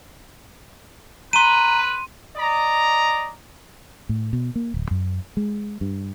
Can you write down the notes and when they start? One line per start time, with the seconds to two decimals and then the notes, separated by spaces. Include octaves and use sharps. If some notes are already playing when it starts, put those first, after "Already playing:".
1.33 B4 A#5 C6 D#7
2.37 D5 D#5 A#5
4.09 A2
4.33 B2
4.56 A#3
4.74 D1
4.91 F#2
5.37 G#3
5.81 G2